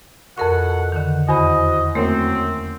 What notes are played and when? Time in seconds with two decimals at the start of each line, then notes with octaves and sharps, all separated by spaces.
0.38 F2 B2 A4 A#4 F#5 C#6
0.92 D3 D#3
1.29 E2 F#4 C5 D#5 B5
1.95 F#2 A3 A#3 C4